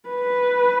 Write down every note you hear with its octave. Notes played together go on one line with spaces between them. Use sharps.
B4